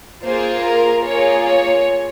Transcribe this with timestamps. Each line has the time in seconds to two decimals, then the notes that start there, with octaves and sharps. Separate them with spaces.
0.23 A#3 F4 G#4 C5
0.64 A#4
1.05 A#3 F4 G#4 C#5
1.45 C#5